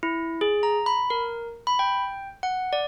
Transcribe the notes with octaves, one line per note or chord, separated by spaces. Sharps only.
E4
G#4
A#5
B5
A#4
B5
G5
F#5
D5